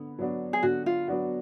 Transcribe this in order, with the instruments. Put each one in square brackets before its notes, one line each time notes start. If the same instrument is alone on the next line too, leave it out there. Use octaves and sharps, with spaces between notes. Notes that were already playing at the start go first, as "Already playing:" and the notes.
Already playing: [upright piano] D3 B3
F#3 B3 D4 F#4
[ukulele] G#4
[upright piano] D3 [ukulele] F#4
[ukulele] F4
[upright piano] F#3 B3 D4 F#4